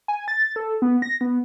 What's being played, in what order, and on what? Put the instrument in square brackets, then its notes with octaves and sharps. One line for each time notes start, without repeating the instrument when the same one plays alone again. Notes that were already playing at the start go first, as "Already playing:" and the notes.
[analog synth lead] G#5
A6
A4
B3
A#6
B3